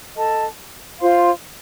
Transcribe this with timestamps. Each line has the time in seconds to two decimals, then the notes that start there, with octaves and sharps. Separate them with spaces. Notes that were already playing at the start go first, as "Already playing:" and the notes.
0.15 A4 D#5 A5
0.99 F4 C5 F5 C6